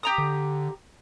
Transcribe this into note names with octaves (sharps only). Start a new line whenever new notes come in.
G4 A#5 D#6
D3